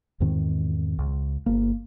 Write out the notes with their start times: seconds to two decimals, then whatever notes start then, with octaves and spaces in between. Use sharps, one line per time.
0.20 E2 G#2 D#3 C4
0.99 C#2
1.46 G1 A#3